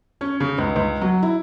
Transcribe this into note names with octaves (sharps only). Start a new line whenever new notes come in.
C#4
C#3
C#2
C#2
F#3
E4